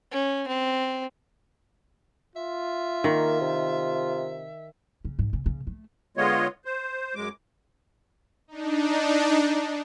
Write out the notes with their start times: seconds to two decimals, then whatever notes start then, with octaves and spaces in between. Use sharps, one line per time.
0.12 C#4
0.48 C4
2.36 F4 E5
3.04 D#3 A#3
3.41 C3
5.05 C#3
5.19 G#2
5.33 C#3
5.46 C#3
5.67 A3
6.17 D3 G#3 B3 F4 C#5 D#5
6.65 C5
7.15 F#2 G#3 D6
8.48 D4 D#4